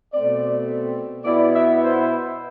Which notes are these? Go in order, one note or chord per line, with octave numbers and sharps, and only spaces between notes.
B2 A3 C4 D5
B2 B3 E4 D5
E5
C5